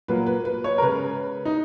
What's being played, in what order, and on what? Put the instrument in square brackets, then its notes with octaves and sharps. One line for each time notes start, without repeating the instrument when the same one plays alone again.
[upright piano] A#2 F#3 A#3 B4
B4
B4
C#5
A#4
C#3 G#3 B4
D#4